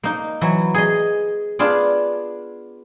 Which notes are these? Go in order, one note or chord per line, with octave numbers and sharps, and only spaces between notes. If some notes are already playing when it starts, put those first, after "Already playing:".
A#3 D#4
E3 F#3
G#4 D#5
B3 D4 F4 G#4 D5